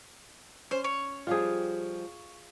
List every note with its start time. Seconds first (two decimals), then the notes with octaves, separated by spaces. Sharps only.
0.71 C#4 C5
0.84 C#5
1.27 F3 G3 F4 G4 G#4